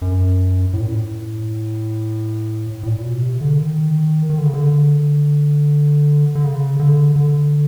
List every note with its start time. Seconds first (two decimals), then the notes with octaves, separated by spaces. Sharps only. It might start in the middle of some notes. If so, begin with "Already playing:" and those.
0.02 F#2
0.73 A2
0.80 A#2
0.87 A2
2.83 A2
2.87 A#2
3.04 B2
3.22 C3
3.41 D3
3.58 D#3
4.30 D#3
4.38 D3
4.46 C#3
4.54 D3
6.35 D3
6.44 C#3
6.79 D3
7.16 D3